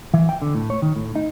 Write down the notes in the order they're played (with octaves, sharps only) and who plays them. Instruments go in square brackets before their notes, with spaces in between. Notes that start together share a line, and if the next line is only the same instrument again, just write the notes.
[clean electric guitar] E3
G5
D3
A2
C#5
D#3
A2
D#4